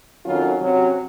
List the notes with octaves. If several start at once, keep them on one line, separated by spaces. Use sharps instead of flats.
F2 D#3 F#3 C#4 F4
C3 F#3 C#4